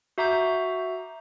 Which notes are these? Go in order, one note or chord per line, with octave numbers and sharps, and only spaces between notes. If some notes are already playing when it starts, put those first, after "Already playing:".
F#4 E5 A#5 D6 G6